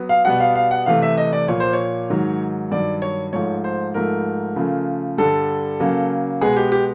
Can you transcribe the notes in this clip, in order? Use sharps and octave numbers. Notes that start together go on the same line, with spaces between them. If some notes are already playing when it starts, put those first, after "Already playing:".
Already playing: F#3 B3
F5
B2 G3 B3 F#5
F5
F5
F#5
C3 E3 A3 F5
E5
D#5
D5
A#2 F3 A#3 C#5
C5
C#5
G#2 D#3 F#3
G2 D#3 F#3 D5
C#5
G#2 F3 A3 C#5
C5
G#2 F3 A3 A#4
C#3 F3 A3
G2 D3 G3 A4
C#3 F#3 A#3
B2 G#3 B3 G#4
G4
G4